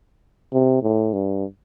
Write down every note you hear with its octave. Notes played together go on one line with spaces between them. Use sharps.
C3
A2
G2